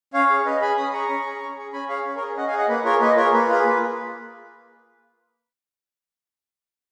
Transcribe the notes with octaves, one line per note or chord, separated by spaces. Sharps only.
C#4 C#5 F5
G#4
C#4 B4 D#5
G#4 G#5 B5
C#4 B5 D#6
G#4 A#5 C#6
C#4
G#4
C#4
G#4
C#4 G#5 B5
G#4 C#5 F5
C#4
A#4 C#5
G#4
C#4 D#5 F#5
F5 G#5
G#4
D#5 F#5
A#3 B4
F4 G#4 A#4 C#5
A#3 B4 D#5
F4 G#4 A#4 C#5
A#3 B4
F4 G#4
A#3